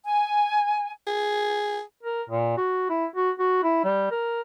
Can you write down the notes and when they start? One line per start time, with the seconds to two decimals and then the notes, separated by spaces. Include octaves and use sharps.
0.04 G#5
1.07 G#4
2.03 A#4
2.29 A#2
2.57 F#4
2.90 E4
3.16 F#4
3.39 F#4
3.64 E4
3.84 G3
4.11 A#4